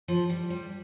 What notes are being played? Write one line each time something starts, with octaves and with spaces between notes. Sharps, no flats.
F3
G3
G3